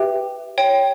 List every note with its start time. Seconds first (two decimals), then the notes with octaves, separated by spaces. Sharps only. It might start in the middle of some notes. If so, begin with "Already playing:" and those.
Already playing: G4 B4 E5 G5
0.58 C#5 G5